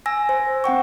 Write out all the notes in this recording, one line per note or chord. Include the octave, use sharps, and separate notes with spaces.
G#5 E6 A#6
C5
C4 F#5 G5 C#6